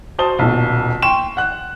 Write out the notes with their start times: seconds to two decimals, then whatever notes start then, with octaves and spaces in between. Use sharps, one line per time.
0.19 F#4 C5 A5 D#6 G7
0.39 D#1 B1
1.02 G5 C6 C#6 E7
1.37 F#5 F#6